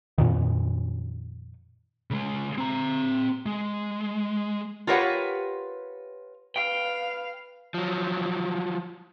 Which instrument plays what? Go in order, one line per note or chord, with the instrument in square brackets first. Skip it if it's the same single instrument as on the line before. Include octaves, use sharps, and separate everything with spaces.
[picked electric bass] F2 A#2 D#3
[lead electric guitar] C#3 G#3
C4 A#5
G#3
[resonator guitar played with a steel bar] F4 G4 A#4 B4 C#5 F#5
[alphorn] B4 [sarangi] F5 [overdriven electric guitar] G5
[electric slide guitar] F3 F#3